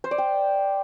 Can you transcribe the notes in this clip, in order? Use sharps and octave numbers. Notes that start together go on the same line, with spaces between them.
C5
D5
G5